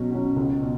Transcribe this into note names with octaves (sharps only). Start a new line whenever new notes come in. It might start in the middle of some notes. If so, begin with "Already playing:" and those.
Already playing: B2 F#3 C#4 F#4
F#3 C#4 F#4
C#2
B2